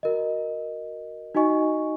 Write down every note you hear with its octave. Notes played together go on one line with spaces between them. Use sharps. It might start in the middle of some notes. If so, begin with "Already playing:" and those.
F#4 A#4 D#5
D#4 F#4 D#5 G#5 C#6